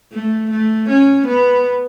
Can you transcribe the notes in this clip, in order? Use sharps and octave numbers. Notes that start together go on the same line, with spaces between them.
A3
A3
C#4
B3